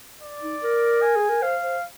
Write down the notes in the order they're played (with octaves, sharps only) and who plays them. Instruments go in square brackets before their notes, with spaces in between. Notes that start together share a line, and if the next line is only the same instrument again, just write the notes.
[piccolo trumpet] D5
[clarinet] D#4
A#4
[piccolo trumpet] G#5
[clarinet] G#4
A#4
[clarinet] C5 [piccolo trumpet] F5
[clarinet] C5